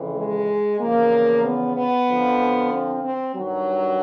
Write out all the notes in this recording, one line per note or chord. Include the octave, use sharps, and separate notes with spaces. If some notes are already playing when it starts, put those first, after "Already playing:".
Already playing: F2 C#3 E3
G#3
E2 C#3 F3 A#3
B3
B3
F2 D3 F3
C4
C4
G2 D#3 F#3